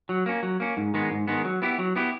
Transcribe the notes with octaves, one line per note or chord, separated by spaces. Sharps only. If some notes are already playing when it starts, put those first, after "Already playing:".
F#3
A#3 C#4
F#3
A#3 C#4
G#2
D#3 G#3 B3
G#2
D#3 G#3 B3
F#3
B3 E4 G4
F#3
B3 E4 G4